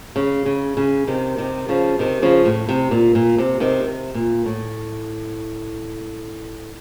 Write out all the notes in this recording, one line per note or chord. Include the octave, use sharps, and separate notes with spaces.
C#3
C#3
C#3
C3 D#3
C3 D#3
C#3 F3
C3 D#3
C#3 F3
A2
C3
A#2
A#2
C3
C3 D#3
C3
A#2
A2